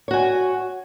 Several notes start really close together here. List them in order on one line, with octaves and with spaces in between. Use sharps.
C#5 F#4 G#5